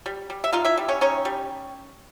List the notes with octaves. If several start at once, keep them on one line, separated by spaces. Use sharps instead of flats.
G3
G3
E5
D#4 F4 F5
E4 E5
G3
C#4 C#5
C#4 D#4 C#5
G3